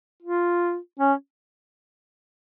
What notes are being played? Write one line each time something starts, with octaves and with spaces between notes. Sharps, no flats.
F4
C#4